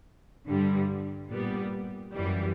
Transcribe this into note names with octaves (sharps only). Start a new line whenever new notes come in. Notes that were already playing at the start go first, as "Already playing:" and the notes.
G2 D3 G3
A#2 G3 B3
F#2 E3 G3